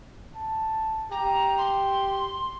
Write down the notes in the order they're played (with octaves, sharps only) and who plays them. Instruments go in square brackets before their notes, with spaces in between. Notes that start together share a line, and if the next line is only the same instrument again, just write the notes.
[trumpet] A5
[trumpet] G4 [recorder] A#5
[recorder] C6